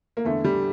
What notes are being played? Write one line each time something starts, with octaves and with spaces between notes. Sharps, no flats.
A#3
E2 D3 A3
G3